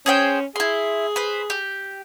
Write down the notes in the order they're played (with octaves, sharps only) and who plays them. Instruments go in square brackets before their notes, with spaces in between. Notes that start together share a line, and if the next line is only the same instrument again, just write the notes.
[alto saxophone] C#4 [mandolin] G#4 C5 G5
[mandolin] E4 C6 [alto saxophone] G#4
[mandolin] B4 C5
G4